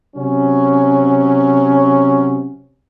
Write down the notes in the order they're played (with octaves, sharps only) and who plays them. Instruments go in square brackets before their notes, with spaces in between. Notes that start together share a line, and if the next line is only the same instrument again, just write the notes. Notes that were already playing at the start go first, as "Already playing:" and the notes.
[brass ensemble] C3 F#3 C#4